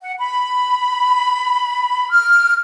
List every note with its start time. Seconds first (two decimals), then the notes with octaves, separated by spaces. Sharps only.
0.02 F#5
0.19 B5
2.10 F6